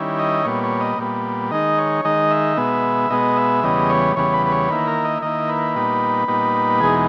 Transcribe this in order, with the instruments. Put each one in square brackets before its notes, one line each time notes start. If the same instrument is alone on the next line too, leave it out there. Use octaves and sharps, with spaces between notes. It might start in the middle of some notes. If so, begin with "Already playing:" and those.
Already playing: [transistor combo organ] D#3 G3 C#4 E4
D#5
A#2 G3 B3 C#5
C#5
D#5
A#2 G3 B3
D#3 G#3 D#4 D#5
C#5
D#3 G#3 D#4 D#5
E5
B2 G#3 B3
B2 G#3 B3 D#5
E5
E2 C#3 G3 B3 D#5
C#5
E2 C#3 G3 B3 C#5
B4
B4
C#5
D#3 A#3 E4 B4
A#4
D#5
D#3 A#3 E4 D#5
B4
A#2 G3 B3 D#4
A#2 G3 B3 D#4
E2 B2 G#3 D#4 G#4